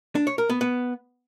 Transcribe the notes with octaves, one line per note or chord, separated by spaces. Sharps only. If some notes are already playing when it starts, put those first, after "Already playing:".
D4
C#5
A#4
B3
B3